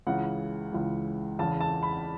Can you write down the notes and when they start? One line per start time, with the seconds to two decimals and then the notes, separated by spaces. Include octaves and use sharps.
0.07 C#2 C#3 E3 F#5
0.73 C#2 C#3 E3
1.39 E2 C#3 E3 A5
1.61 A5
1.83 B5